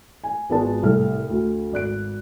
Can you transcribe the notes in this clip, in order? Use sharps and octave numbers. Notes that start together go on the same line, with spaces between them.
G#5
G#1 G#3 B3 F4 D5 A5
C2 A2 A4 F6
D2
G#1 D5 F#6 D7